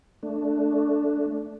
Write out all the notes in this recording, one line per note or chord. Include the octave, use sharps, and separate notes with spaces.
A3 D4